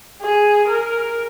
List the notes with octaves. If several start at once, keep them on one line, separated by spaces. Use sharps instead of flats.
G#4
A#4